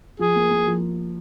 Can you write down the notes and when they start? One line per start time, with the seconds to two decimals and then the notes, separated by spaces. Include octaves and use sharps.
0.19 F3 G#4
0.36 A#3
0.51 A#3
0.66 F3